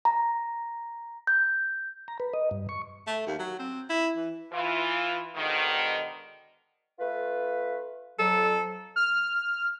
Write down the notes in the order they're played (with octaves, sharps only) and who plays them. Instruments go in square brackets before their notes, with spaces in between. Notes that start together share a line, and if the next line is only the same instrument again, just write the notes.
[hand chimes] A#5
G6
[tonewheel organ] A#5
B4
D#5
G2
C#6
[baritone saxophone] A3
D#2
F#3
C4
E4
E3
[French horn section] E3 F4
G#2 B2 D3 D#3
[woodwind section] A3 F4 B4
[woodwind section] F2 F#3 [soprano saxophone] A4
[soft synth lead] F6